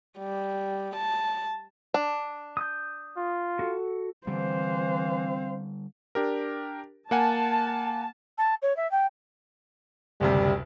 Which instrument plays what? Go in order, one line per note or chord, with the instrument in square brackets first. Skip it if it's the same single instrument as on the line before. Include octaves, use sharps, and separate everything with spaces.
[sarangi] G3
A5
[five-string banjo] D4
[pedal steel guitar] D#6 G6
[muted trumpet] F4
[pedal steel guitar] F#4 A4
[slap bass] D3 G3 [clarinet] E3 [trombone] C4 [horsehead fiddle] C5 F5
[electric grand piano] D4 G4 A#4
[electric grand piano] A#3 F#5 G#5 [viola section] A5
[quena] A5
C#5
E5
G5
[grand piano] F#1 D2 C3 [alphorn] G3